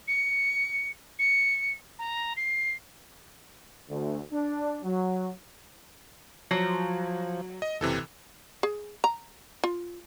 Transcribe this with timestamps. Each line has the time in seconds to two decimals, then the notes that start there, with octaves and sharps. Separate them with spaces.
0.08 C#7
1.19 C#7
1.99 A#5
2.37 C7
3.88 D2
4.31 D4
4.82 F#3
6.51 F3 F#3
7.62 D#5
7.81 F#1 C3 E3 A4
8.63 G#4
9.04 A#5
9.64 F4